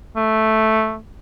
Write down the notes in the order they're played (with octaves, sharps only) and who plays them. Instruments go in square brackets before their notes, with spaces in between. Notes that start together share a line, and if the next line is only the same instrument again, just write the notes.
[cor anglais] A3